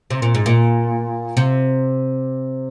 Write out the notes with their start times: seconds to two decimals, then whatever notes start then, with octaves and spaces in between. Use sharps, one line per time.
0.10 C3
0.22 A#2
0.35 G#2
0.46 A#2
1.37 C3